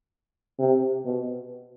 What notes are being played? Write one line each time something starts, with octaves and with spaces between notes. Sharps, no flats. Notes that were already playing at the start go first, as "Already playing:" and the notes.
C3
B2